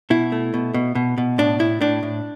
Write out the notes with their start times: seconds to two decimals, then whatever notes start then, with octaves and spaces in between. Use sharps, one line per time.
0.10 B2 E4
0.32 A3
0.54 B2
0.74 B2
0.95 B2
1.18 B2
1.38 A2 D4
1.59 A2 E4
1.81 A2 D4
2.03 A2